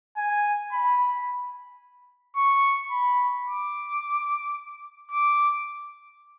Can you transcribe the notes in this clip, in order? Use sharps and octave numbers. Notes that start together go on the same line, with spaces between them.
G#5
B5
C#6
B5
D6
D6